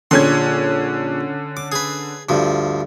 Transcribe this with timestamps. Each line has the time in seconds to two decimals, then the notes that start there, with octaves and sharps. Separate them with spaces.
0.11 A#1 D3 C#4 C6 G#6
1.57 D6
1.72 G#4 B4
2.29 D2 G2 F3